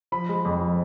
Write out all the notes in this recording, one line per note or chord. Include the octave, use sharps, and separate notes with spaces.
F3 B5
G#3
F2
F3